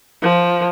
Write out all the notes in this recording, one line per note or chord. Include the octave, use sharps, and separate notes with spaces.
F3